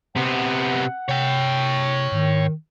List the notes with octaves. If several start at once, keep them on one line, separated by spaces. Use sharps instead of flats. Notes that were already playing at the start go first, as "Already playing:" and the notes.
C3 B3 F#5
C3 C#5 G5
G#2 D#3